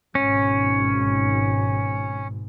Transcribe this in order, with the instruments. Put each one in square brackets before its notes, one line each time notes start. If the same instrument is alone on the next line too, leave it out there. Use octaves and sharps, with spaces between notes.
[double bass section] G#1 G#2 B2 [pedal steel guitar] C#4